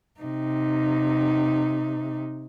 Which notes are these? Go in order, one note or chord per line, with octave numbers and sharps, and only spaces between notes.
C3 D#4